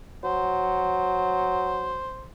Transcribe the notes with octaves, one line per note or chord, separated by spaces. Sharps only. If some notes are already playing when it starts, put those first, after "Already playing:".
F#3 C5